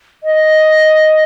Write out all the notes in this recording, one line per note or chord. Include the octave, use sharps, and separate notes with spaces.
D#5